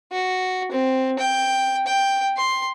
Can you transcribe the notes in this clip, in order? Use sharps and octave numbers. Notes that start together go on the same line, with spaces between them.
F#4
C4
G5
G5
C6